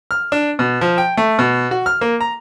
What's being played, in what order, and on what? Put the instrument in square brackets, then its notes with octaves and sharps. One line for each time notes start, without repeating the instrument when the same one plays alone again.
[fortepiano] F6
D4
B2
F3
G5
A3
B2
F#4
F6
A#3
A#5